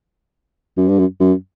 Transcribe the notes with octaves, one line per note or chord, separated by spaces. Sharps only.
F#2
G2
F#2
F#2